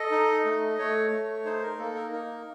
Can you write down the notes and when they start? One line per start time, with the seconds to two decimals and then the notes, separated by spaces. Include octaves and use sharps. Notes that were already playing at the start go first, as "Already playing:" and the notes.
Already playing: A4 D#5
0.11 D#4
0.45 A3
0.78 A3 C#5
1.11 A3
1.45 D#4 C5
1.62 A#4
1.79 A#3 A4
1.95 A#4
2.12 D#4 A#4